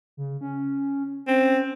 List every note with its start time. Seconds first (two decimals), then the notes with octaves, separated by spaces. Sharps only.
0.17 C#3
0.41 C#4
1.27 C4 C#4